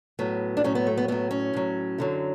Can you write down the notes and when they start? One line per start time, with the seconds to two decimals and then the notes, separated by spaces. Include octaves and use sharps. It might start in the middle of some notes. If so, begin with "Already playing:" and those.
0.19 A2 F#3 B3
0.57 D4
0.64 A2 F#3 C#4
0.75 B3
0.87 A3
0.97 B3
1.08 A2 F#3 B3
1.31 C#4
1.53 A2 F#3
1.98 F#2 D3 F#3